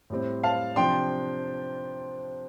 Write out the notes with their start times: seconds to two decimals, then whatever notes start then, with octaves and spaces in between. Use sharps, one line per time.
0.10 A2 G3 C4
0.43 F5 A5
0.76 C3 F3 D4 G5 C6